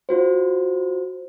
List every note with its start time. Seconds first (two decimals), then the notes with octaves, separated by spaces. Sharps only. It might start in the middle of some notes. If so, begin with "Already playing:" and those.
0.09 F4 F#4 C5